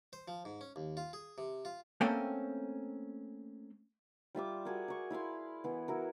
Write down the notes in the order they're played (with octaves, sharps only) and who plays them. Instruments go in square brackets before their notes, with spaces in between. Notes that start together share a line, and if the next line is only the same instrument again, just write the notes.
[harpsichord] C5
F3
G#2
C#4
D#2
F4
G#4
C3
F4
[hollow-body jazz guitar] A3 A#3 C4 C#4 A4 G5
[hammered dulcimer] G3 F4 E5 D6
F#4 G#4 A#4
A#4 C#6
E4 F5 B5 C6
E3 B3
E4 F#4 A#4